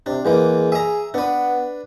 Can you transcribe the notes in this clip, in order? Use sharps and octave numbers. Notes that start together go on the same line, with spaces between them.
C3 D4
E2 E3 G#3 A#3
G#4 E5 A#5
B3 D4 B4